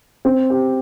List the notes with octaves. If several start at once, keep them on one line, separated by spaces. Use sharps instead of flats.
C4
G4